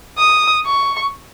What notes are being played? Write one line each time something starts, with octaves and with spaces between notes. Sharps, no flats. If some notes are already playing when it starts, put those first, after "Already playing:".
D#6
C#6